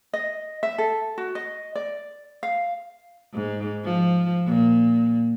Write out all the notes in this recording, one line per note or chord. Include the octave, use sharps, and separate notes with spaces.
D#5
E5
A4
F#4
D#5
D5
F5
G#2
F3
A#2